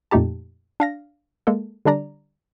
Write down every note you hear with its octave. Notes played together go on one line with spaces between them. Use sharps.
F2 A#2 A3 D#4 G4 A5
D4 F5 A#6
G#3 A#3 A4
D3 G3 D4 D5 A#5